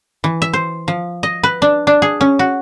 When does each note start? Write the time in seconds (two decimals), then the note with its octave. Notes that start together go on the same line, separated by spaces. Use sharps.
0.24 E3
0.42 E5
0.53 C5
0.88 F3
1.23 D#5
1.43 B4
1.62 D4
1.87 D4
2.02 G#4
2.21 C#4
2.39 F#4